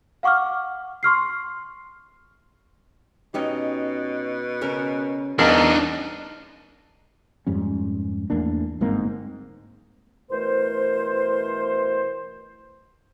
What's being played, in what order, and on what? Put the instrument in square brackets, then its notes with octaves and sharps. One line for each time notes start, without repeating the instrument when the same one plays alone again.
[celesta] F5 F#5 C#6 D6 F6
C6 C#6 F6 C7
[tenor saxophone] B2 [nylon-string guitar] C#4 D#4 G4
[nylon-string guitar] C#3 C#4 A#4
[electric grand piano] E2 [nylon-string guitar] G3 D#5 F5 [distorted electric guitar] D4 D#4 [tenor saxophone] A#4
[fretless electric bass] F2 G#2 G3 C#4
E2 A3 A#3 D4
G1 G#2 A#3 C4
[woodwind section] B2 E3 A3 A#4 C5